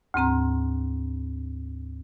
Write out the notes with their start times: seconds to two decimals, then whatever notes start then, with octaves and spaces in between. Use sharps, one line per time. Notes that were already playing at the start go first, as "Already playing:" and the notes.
0.14 D2 G#2 C4 A#5